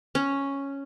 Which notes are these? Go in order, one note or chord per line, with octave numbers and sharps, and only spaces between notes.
C#4